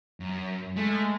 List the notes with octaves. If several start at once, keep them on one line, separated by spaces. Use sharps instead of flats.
F#2
G#3 A3